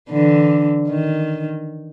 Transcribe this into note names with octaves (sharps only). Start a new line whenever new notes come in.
D3 E3
D#3